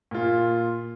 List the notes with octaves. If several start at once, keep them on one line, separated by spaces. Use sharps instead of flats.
A#2 F4